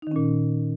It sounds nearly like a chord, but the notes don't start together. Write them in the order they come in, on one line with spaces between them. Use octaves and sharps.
D#4 D#3 C#4 A#2